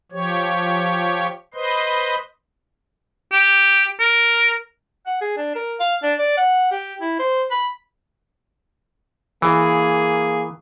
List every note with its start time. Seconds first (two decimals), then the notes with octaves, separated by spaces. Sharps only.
0.12 F3 G4 C#5
1.54 B4 C5 D#5 C6
3.32 G4
4.00 A#4
5.07 F#5
5.21 G#4
5.37 D4
5.55 A#4
5.80 F5
6.03 D4
6.19 D5
6.38 F#5
6.71 G4
7.01 E4
7.19 C5
7.51 B5
9.42 E3 A#3 G#4